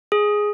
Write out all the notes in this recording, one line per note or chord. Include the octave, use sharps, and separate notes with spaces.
G#4